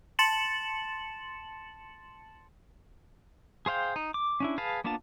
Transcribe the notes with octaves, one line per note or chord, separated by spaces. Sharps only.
A5 C6 A6 C#7 E7 F#7
G#4 C5 F5 G5
D#4
D6
C#4 D4 E4
G#4 B4 F5 A5
A#3 B3 D4 F4 A5